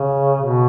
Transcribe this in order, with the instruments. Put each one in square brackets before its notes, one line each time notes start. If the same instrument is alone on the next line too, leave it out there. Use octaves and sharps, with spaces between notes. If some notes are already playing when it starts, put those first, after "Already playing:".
Already playing: [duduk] C#3
B2